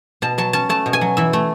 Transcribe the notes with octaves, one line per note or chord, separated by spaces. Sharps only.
B2 A5
F#3 A5
C#4 A5
A3 A5
B2
G#5
F#3
E3 E5
A3